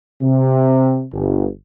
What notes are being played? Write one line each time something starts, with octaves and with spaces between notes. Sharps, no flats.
C3
G1